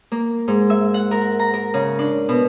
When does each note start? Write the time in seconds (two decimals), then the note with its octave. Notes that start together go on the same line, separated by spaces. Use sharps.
0.12 A#3
0.48 G#2
0.70 E5
0.94 F#5
1.11 A#4
1.39 A#5
1.54 A#4
1.74 C#3
1.99 D4
2.29 B2